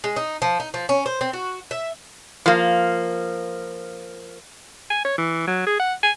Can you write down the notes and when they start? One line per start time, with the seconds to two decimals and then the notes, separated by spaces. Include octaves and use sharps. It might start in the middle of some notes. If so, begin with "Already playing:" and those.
0.04 G#3
0.16 D#4
0.42 F3
0.60 D#4
0.74 F3
0.89 C#4
1.06 C5
1.21 C4
1.33 F#4
1.71 E5
2.46 F3 A#3
4.90 G#5
5.05 C#5
5.18 E3
5.47 F#3
5.67 G#4
5.80 F#5
6.03 G#5